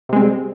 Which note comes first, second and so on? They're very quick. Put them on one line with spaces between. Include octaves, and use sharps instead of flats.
C3 G#3 C4 G3